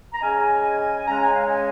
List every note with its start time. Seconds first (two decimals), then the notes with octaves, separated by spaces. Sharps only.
0.13 A#5
0.21 C#3 G#3 C#4 D#5 G#5
1.06 C#3 G#3 C#4 A#5
1.20 G#5
1.34 F5
1.47 D#5 G#5